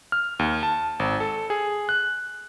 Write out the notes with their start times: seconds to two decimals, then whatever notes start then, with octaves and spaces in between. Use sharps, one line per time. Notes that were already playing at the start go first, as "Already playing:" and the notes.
0.12 F6
0.39 D#2
0.63 A5
0.99 G#1
1.20 A4
1.50 G#4
1.89 F#6